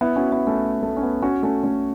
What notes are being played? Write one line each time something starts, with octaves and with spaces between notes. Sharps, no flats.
B3 E4
C#4 F#4
B3 E4
A3 C#4
A3
C#4
B3
C#4 F#4
A3 C#4
A3 C#4